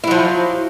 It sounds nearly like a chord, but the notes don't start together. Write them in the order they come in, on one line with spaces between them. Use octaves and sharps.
E4 F#3 F3